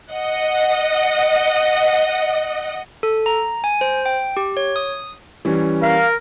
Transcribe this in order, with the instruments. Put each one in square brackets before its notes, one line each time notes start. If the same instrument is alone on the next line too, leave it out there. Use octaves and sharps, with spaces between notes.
[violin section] D#5 F#5
[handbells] A4
A#5
G#5
C5
G5
G4
C#5
D#6
[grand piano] E3 G3 C#4
[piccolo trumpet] A#4 [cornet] F5